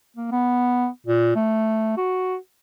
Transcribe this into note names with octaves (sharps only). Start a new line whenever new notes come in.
A#3
B3
A#2
A3
F#4